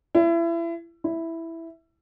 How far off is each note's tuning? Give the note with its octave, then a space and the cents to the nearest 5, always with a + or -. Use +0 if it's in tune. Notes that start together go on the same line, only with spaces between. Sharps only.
E4 +30
E4 +0